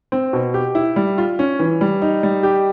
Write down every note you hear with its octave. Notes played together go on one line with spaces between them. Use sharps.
C4
B2
G4
E4
G3
F4
C#4
E3
G3
D#4
G3
G4